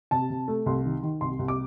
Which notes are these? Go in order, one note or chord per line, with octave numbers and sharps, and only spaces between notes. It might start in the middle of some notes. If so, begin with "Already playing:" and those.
C3 A5
C3
A3
C2 C6
D#3
D#3
C2 C6
C2
D6